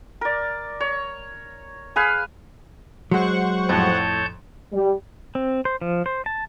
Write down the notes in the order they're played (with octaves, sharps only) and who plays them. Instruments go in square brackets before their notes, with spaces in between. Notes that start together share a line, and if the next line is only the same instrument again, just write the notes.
[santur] A#4 D5
C#5
G#4 B4 F5
[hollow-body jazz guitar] F#3 G#3 [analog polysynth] C5 F#5 C#6
[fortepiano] F2 A2 [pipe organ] C#5 A5 G6
[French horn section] G3
[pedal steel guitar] C4
C5
F3
C5
A5